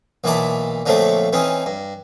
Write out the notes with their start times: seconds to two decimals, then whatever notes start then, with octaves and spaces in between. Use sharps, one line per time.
0.24 B1 A#2 E3 E4 D5 A5
0.86 A#2 D3 F3 F#3 A3 C4
1.33 E3 C4 C#4 D#4
1.66 G2